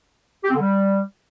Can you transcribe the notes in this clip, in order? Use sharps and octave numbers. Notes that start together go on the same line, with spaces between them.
G4
C4
D3
G3